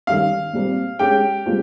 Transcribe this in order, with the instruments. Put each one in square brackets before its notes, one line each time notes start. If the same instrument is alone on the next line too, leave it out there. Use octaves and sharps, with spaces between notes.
[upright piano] D#3 G3 C#4 [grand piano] F5
[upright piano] A#2 G3 C4
[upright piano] G#3 C#4 G#4 [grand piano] G4 G5
[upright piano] A#2 G3 C4 F4 G#4